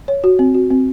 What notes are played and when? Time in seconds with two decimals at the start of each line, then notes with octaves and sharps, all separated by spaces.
0.08 C#5
0.24 F#4
0.39 C4
0.54 F#4
0.71 C4